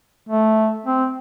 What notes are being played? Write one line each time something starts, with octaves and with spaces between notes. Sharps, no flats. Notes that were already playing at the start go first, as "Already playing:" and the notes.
A3
C4